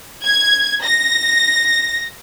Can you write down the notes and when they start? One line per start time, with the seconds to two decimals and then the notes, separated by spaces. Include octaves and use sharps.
0.24 G#6
0.84 A#6